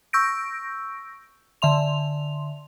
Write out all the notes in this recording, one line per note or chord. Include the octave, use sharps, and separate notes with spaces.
C#6 E6 G6 A#6 D7
D3 E5 C6 F7